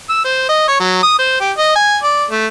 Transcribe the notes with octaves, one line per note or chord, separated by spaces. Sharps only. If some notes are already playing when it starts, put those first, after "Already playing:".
E6
C5
D#5
C#5
F#3
D#6
C5
G4
D#5
G#5
D5
A3